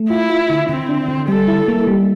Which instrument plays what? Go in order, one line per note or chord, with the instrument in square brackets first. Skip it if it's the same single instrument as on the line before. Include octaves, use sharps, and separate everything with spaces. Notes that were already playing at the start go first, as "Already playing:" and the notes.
Already playing: [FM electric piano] A3
[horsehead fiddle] E4 [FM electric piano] F4
[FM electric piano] F4
D3
[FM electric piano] D3 [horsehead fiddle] C4
[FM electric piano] D4
D3
[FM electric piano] G3 [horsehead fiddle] A4
[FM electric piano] E4
A#3
G3